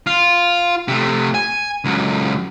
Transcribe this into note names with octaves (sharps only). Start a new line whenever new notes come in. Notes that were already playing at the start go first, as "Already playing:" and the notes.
F4
C3 A3
G#5
C#2 F#3